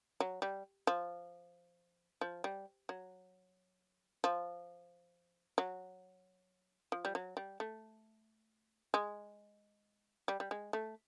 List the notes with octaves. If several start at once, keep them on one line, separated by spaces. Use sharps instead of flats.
F#3
G3
F3
F3
G3
F#3
F3
F#3
F3
G3
F#3
G3
A3
G#3
G3
G3
G#3
A3